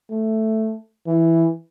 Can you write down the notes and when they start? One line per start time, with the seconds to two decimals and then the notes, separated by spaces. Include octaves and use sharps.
0.10 A3
1.06 E3